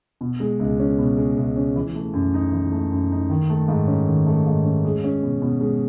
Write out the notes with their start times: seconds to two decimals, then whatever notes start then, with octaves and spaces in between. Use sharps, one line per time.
0.21 B2
0.40 G#3
0.59 C#2
0.79 C#4
0.99 B2
1.17 G#3
1.37 C#2
1.56 C#4
1.76 E3
1.95 A3
2.14 F#2
2.34 D#4
2.53 E3
2.72 A3
2.91 F#2
3.11 D#4
3.30 D#3
3.49 A3
3.68 G#2
3.87 C#4
4.08 D#3
4.26 A3
4.46 G#2
4.64 C#4
4.85 G#3
5.04 C#4
5.23 B2
5.42 B2
5.61 G#3